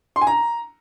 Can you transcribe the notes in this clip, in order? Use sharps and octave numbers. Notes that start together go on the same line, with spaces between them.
C6
G#5
A#5